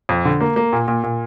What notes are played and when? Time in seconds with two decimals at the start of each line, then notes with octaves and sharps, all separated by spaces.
0.09 F2
0.25 D3
0.41 A#3
0.56 A#3
0.73 A#2
0.88 A#2
1.03 A#2